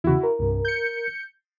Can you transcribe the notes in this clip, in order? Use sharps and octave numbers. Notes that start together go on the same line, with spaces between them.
E2 C#3 E4 F#4
A#4
C2 G2
G6 C#7